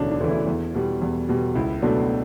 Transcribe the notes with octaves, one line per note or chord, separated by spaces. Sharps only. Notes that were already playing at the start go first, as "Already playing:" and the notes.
Already playing: E1 D2 C#3 E3 C#4 D4
D4
D2 C#3 E3
E4
E2
B2 G3
E2
B2 G3
C#2 E4
B2 F#3 A3 D4